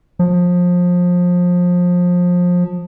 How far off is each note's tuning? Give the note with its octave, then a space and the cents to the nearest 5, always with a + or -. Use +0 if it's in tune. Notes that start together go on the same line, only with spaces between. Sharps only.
F3 +25